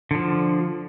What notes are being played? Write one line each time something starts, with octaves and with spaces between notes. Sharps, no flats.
D3 F3